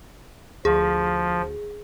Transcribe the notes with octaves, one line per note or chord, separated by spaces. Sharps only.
D2 F3 G#4